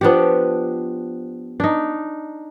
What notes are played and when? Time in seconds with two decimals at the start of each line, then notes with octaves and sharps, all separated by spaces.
0.01 F3 B3 D4 G4 F#5
1.60 D4 D#4